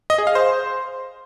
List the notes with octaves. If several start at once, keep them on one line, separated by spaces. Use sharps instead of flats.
D#5
G#4
F5
C5